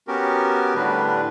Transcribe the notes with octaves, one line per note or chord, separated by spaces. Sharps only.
B3 C#4 F#4 G4 A#4
A2 D3 G3 D4 B4